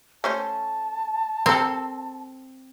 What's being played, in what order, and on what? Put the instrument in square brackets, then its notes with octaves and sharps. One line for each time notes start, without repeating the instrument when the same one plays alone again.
[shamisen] A3 C#4 C5 [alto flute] A5
[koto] C4 [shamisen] A4 A#4